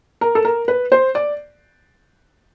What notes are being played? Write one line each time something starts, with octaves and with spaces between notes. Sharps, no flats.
A#4
A4
A#4
B4
C5
D5